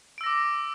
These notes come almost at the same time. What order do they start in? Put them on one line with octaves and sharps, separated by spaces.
D7 E6 A#6 D6